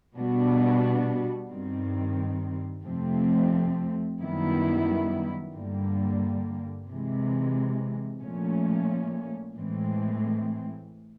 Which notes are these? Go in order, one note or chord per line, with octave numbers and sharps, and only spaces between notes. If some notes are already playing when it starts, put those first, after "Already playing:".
B2 G3 B3 D4 F#4
G2 D#3 G3 C4
F2 C3 F3 A3 C4
F#2 D#3 G3 B3 E4
G2 D3 G3 A#3
C3 E3 G#3
A#2 F3 A3 C#4
A2 E3 G#3 C4